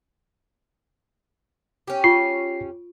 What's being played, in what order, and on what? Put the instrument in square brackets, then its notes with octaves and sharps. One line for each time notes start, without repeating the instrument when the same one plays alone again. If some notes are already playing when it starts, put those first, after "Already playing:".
[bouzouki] C#4 G4
[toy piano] F4 C#6 [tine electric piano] C7